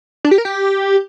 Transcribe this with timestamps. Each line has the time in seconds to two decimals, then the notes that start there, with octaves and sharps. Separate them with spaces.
0.25 D4
0.31 G4
0.38 A#4
0.45 G4